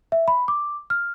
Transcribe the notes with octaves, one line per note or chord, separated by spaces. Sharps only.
E5
B5
D6
F6